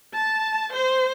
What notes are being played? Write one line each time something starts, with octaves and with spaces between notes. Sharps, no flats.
A5
C5